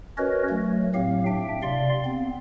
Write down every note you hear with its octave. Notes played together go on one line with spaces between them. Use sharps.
C#4 F#4 A#4 B4 C#5 D#5
F#3 A3
A2 F#3 C4 G4 F5
D4 E5 G5
C3 D5 F5 C6
B3 C4